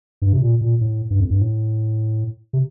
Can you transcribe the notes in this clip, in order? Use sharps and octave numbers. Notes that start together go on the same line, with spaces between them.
G2
C3
A#2
A#2
A2
G2
F2
G2
A2
C3